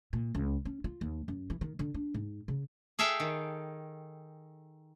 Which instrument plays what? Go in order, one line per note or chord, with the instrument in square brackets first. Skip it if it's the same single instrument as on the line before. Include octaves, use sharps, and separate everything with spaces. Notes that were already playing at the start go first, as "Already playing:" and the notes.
[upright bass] A#2
C#2
C#4
F4
D#2
F#2
E3
D#3
D3
D4
G#2
C#3
[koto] G#4 A4 E5 F5 G5
D#3